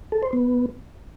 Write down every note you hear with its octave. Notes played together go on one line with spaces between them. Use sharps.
A4
C5
B3